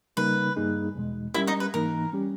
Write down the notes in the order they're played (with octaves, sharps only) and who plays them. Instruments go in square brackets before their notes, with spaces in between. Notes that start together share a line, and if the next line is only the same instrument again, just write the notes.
[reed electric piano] C#3 G3 A#3 D#4 A#4 [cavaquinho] B4
[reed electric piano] G2 G3 A#3 D#4 G#4
E2 B2 G#3
[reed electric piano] G3 C#4 G4 A#4 [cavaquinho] E4 E5
[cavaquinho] D#4 D#5
B4
[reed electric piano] G#2 E3 A#3 D#4 [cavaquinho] A#4
[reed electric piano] G3 C#4 G4